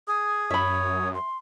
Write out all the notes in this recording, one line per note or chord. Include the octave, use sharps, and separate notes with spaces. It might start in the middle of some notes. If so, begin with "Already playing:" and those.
G#4 D#6
F#2 C#5 E5 B5
C6